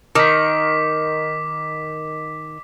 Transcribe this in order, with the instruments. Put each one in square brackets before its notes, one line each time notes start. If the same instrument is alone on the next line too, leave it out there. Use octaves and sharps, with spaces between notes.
[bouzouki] D#3 [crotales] D6 B6